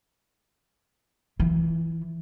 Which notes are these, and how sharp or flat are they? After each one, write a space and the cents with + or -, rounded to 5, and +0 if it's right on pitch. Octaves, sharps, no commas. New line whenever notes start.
E3 +0 F4 -40